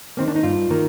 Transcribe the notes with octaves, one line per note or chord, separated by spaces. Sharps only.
D#3 A#3 C4
D4
D#4
G2 F4
D#3 A#3